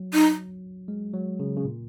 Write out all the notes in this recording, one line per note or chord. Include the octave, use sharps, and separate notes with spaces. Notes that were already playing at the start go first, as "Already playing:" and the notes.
Already playing: F#3
D#4
G#3
F#3
C#3
C#3
A#2